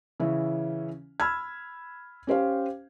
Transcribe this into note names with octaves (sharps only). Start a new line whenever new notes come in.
C#3 E3 C#4 E4
B5 E6 F6 G#6
C#4 G4 C5 F5